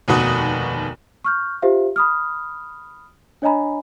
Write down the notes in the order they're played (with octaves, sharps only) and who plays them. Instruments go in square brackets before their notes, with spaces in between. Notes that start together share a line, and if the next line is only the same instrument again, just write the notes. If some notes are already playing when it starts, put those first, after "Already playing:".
[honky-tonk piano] F1 D#2 B2 F#4 D#6
[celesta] C#6 F6 G6
F4 G4 C5 E5 F5
B5 D#6 F6
D4 C#5 D#5 G#5 A#5 B5